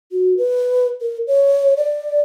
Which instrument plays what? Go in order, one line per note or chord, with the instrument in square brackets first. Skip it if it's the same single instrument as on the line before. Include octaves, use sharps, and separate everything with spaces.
[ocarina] F#4
B4
A#4
C#5
D5